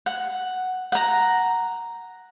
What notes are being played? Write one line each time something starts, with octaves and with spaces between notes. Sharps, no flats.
F#5
F#5 A#5